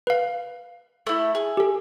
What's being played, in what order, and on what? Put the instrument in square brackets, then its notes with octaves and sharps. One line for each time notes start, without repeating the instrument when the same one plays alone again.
[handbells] B4 F5
[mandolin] A3 E4
G#4
[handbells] G4 A4